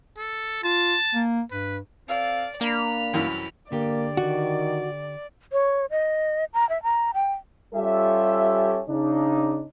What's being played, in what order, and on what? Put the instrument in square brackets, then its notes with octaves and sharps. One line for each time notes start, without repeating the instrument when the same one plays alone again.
[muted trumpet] A4
[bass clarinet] F4 [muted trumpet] A5
[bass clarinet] A#3
[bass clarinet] G2 [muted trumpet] B4
[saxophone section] C4 A4 F5 [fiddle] D5
[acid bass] A#3 [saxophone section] D4 [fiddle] B5 F6
[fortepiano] C2 F#2 E3
[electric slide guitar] D3 G4 [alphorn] A#3 [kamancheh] D5
[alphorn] D#3 [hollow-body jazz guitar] F#4
[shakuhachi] C#5
D#5
A#5
E5
A#5
G5
[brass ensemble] G3 C#4 F4 G4 A4 E5
C#3 D4 D#4